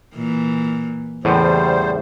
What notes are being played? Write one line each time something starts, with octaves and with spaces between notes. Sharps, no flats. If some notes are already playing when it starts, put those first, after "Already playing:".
A#2 E3
E2 A2 C#3 G3 C5